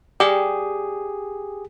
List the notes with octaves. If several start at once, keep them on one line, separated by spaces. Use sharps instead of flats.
G3 G4 G#4